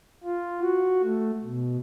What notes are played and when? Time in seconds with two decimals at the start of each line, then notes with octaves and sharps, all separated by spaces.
0.24 F4
0.60 F#4
1.03 A3
1.44 B2